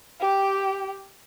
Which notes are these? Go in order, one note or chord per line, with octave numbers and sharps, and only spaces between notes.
G4 G5